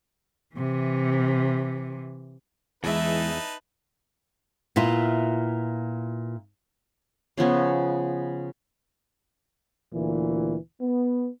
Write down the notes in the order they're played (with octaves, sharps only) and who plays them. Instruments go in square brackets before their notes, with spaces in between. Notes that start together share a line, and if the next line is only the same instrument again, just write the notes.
[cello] C3 E3
[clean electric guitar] E2 [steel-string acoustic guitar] E3 G#3 [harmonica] D#4 B4 A5 [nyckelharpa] E5
[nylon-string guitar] A#2 B3 E4 F4
[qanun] C#3 F3 B3 C#4
[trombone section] D2 A#2 E3
B3